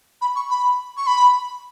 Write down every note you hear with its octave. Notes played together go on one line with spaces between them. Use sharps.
B5
C#6
B5
C#6
B5